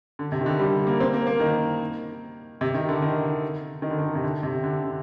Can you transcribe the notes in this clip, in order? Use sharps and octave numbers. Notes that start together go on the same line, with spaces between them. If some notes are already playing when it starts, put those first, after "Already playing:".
D3
C3
D#3
D3
G3
A#3
C4
A#3
A#3
D#3
C3
D#3
D3
D#3
D#3
D3
D#3
C3
D3
C3
D3
D3